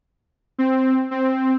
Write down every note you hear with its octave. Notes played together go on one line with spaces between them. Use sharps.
C4
C4